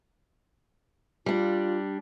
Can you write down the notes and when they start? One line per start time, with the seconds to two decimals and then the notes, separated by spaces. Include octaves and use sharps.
1.26 G3 D4 F4